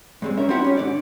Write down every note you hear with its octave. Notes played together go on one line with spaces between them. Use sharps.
G2 G#3 C4
C#4 A#4 E5
C4 D#4 E4 F#4 G4 A#4
C#4 G4
G#2 D3 D5